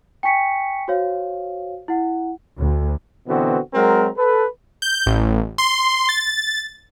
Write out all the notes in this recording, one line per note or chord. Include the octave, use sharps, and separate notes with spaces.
G5 G#5 C#6 B6 C#7
F#4 C5 C#5 F5
E4 F#5
D2
B2 D3 E3 B3 C4 F#4
F#3 G#3 C4 F#4 A#4
A4 B4
G6
A1
C6
A6